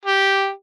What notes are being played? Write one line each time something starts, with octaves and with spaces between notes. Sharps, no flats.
G4